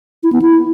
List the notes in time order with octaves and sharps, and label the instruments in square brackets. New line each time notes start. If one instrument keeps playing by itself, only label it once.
[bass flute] E4
B3
E4